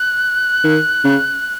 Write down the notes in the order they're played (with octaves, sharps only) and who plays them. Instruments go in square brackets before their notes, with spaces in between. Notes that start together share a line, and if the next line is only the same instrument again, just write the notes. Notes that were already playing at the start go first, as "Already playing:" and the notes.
Already playing: [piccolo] F#6
[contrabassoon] D#3
C#3